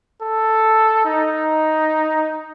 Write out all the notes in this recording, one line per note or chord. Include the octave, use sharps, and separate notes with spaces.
A4
D#4